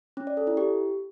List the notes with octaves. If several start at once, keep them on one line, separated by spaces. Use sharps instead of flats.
C#4
D5
A4
E4
G4